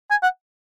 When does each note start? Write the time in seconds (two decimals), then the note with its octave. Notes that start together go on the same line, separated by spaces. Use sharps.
0.11 G#5
0.23 F#5